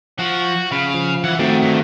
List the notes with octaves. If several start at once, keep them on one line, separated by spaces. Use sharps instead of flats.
F3 F#4
C#3 F5 B5
F3
E3 F#5
D#3 A3 C4 F#4 A4 G5
G2